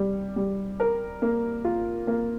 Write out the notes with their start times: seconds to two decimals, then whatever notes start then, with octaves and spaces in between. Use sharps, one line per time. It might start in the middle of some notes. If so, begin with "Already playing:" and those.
Already playing: G3
0.36 G3
0.80 A#4
1.22 A#3
1.65 F4
2.07 A#3